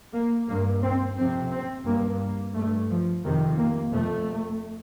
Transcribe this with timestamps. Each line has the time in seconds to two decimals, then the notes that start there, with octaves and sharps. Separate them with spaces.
0.13 A#3
0.48 G2 A#3
0.82 C4
1.17 F2 C3 C4
1.51 C4
1.85 G2 A#3
2.20 A#3
2.54 G2 A3
2.90 F3
3.24 F2 C3 D#3
3.58 A#3
3.92 F2 C3 A3